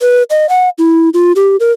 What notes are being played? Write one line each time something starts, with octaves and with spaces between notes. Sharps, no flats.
B4
D#5
F#5
E4
F4
G4
A#4